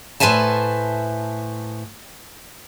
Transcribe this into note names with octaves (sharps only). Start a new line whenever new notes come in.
A2 B4 C5 E5 G#5 A5